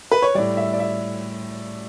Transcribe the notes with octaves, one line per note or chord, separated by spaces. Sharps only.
B4
C#5
A2 G3 D5
E5
D5
E5